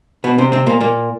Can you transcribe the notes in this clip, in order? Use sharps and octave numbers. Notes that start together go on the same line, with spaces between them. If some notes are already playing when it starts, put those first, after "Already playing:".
B2 B3
C3 C4
C3 C4
A#2 A#3
A#2 A#3